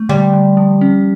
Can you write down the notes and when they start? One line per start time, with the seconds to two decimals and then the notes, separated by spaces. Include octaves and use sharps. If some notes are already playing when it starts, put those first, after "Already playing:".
Already playing: A3
0.09 D3 G3
0.33 D3
0.57 F3
0.81 C#4